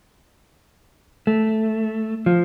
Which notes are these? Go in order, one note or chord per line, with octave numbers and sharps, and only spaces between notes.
A3
F3